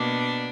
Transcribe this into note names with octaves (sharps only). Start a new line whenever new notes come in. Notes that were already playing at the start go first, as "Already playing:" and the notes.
Already playing: B2 A#3 D4 D5